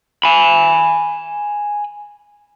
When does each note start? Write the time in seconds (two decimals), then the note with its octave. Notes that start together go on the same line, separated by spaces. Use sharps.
0.24 G#5 B5